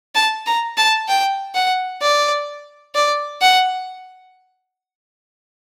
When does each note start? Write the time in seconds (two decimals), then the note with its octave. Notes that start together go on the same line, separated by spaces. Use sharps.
0.15 A5
0.46 A#5
0.77 A5
1.08 G5
1.55 F#5
2.02 D5
2.95 D5
3.41 F#5